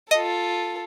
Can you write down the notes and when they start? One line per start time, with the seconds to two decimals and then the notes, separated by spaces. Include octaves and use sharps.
0.11 F4 A4 D#5 D#6